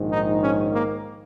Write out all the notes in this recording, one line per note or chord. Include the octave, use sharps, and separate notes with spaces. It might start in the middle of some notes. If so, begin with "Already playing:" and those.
Already playing: A#1 G#2 D#3
D#4
C#4
A#3